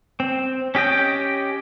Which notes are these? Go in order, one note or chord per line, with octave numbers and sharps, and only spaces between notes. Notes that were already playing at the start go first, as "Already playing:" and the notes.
C4
C#4 G4 D#5 G5